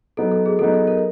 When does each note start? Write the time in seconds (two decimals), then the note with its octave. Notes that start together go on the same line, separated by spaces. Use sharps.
0.17 F#3 B3 D#4 A4
0.32 A4
0.46 G#4
0.59 F#3 B3 D#4 A4
0.74 A4
0.87 A#4